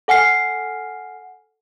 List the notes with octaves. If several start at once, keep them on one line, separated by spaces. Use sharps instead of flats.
A4 F#5 G#5 F6 C7